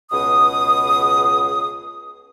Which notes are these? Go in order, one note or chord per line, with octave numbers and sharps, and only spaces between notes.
C#2 B2 D#6